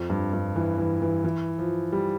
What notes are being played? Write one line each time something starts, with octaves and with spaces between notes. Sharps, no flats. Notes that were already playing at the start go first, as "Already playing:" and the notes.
Already playing: F2
G2
G2
E3
E3
E3
E3
F3
G3